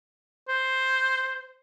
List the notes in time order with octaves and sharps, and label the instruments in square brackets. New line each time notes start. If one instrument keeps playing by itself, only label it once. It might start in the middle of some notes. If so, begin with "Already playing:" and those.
[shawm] C5